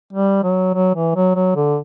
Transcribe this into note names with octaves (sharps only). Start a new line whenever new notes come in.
G3
F#3
F#3
E3
F#3
F#3
D3